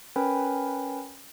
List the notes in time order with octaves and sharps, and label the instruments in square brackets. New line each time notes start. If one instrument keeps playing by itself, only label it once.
[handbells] C#4 A#4 B4 G5 G#5 B5